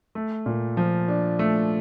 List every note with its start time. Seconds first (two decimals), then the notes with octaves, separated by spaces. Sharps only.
0.15 A3
0.46 A#2
0.77 F3
1.08 D4
1.39 A3